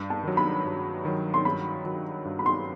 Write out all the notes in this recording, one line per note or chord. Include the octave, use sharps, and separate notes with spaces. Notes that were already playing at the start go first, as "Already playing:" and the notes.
Already playing: G2
A5
D#3 F#3
B5
G2
D#3 F#3
C6
G2 B5
D#3 F#3
G2
B5
C6